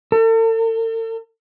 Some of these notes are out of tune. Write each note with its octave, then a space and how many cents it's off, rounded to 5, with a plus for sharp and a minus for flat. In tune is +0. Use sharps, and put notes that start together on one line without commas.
A4 +45